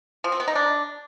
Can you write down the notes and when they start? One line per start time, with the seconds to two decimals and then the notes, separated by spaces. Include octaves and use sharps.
0.24 F3
0.32 C4
0.40 B3
0.48 D#4
0.55 D4